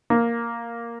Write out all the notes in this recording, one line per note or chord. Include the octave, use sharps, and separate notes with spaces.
A#3